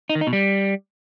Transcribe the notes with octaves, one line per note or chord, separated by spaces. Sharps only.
D#4
D#3
D#4
B2
G3